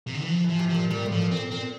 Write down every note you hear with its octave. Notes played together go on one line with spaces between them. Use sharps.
C3
D3
E3
F3
E3 F3
C3
F3
A#2
A#2 G3
A2
F3
A#2
C4
A#2
A#2 C4